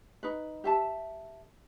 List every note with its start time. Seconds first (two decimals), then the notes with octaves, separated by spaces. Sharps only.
0.23 D#4 B4
0.64 G4 E5 A5